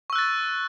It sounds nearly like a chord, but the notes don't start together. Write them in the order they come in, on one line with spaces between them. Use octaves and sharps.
C#6 E6 F#6 A6